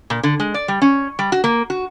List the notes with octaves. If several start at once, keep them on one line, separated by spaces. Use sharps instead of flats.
A#2
D3
G#3
D5
G3
C#4
G3
F#4
A#3
F#4